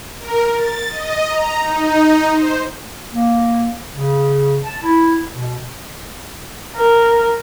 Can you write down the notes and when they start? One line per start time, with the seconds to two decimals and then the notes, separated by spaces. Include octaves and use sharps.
0.19 A#4
0.53 A6
0.90 D#5
1.28 A#5
1.59 D#4
2.33 C5
3.12 A#3
3.93 C#3
4.64 A5
4.83 E4
5.32 B2
6.75 A#4